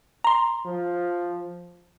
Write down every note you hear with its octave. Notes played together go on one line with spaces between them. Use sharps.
A#5 C6
F3